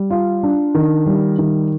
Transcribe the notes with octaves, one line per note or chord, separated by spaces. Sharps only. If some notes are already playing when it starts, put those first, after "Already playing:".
Already playing: G3
F4
D4
D#3
G3
D#3